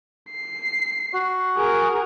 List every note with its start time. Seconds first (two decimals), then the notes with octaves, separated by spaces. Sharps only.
0.30 C7
1.13 F#4
1.57 G#4 A#4